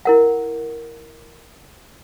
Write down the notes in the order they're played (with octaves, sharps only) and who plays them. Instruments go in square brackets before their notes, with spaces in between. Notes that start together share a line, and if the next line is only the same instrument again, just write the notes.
[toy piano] E4 A#4 F#5